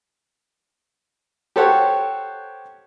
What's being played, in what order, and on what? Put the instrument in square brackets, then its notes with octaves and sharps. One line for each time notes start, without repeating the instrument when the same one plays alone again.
[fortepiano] G4 A4 C5 C#5 F#5